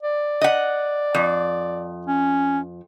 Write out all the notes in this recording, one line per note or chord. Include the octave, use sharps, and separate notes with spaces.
D5
D#5 F#5
F2
C#4